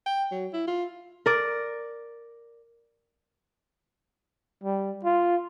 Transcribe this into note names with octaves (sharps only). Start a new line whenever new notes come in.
G5
F#3
E4
F4
A#4 D5
G3
F4